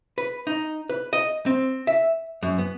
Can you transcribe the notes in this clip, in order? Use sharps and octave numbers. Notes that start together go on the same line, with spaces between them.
B4
D#4
B4
D#5
C4
E5
F#2
B3